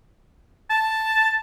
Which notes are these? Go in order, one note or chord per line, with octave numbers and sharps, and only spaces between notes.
A5